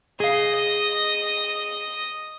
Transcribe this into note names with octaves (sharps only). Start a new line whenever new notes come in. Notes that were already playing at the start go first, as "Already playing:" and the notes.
G#4 D#5 F5